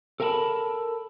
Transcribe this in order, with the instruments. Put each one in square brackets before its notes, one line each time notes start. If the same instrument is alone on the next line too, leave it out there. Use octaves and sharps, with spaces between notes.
[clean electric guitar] A4 A#4 F5 G#5 A5 B5